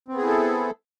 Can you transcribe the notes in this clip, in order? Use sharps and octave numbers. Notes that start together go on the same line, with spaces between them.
B3 C4 E4 G#4 A4